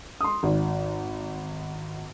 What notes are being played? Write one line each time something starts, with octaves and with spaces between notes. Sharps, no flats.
C6 D#6
G#1